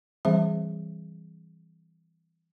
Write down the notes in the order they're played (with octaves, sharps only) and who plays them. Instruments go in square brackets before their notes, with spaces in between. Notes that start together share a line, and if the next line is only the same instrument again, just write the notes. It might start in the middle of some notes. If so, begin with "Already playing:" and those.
[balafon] E3 G3 C4 G#4 C5 E5